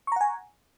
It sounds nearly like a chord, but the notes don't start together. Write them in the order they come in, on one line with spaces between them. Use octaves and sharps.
C#6 A#5 F#5 G#5